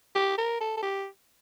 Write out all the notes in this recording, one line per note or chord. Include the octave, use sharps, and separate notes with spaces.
G4
A#4
A4
A4
G4